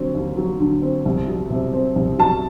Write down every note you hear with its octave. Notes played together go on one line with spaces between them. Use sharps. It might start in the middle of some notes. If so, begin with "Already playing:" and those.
Already playing: D3 F#3 C4
D#2
F#3
D3
C4
C2
F#3
C3
C4
C2
F#3 A5